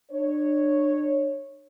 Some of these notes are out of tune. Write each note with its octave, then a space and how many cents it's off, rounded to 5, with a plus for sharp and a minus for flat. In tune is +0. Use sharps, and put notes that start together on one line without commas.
D4 +30 C#5 -5